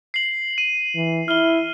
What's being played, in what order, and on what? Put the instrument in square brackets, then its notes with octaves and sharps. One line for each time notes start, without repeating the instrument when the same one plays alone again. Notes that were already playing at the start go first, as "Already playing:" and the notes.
[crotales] C7 F#7
D#7
[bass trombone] E3
[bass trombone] E4 [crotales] F6 G7